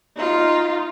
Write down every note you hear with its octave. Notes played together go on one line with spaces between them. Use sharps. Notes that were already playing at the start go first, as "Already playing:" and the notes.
D#4 F4